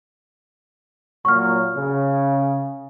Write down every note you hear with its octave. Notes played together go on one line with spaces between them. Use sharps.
A#2 F#3 C#6 F6
C#3